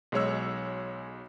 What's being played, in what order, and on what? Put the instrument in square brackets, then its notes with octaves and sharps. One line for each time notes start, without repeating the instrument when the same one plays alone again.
[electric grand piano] B1 G#3 C#5 E6